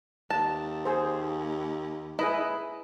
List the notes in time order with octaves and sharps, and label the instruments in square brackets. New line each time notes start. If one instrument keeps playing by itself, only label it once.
[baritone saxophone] D#2 [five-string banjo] A5
[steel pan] G#4 C5
[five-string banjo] E4 [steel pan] G#4 B4 D#5